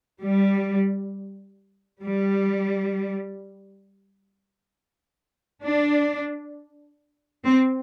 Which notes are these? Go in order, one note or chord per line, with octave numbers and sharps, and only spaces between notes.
G3
G3
D4
C4